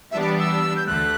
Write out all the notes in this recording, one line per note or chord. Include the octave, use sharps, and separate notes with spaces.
E3 G3 B3 D4 E5
D5
E6
G6
D2 D3 A3 F#6